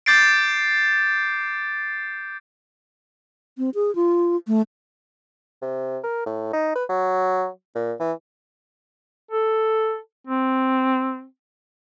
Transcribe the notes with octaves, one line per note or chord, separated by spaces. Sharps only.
D6 G6 A6 C7 D7
C4
G#4
F4
A3
C3
A#4
A2
D#4
B4
F#3
A#2
E3
A4
C4